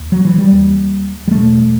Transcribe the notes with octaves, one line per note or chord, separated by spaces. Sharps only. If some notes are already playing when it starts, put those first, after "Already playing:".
Already playing: D#2
F#3
E3
G3
D#2
G3
E2 B2 A3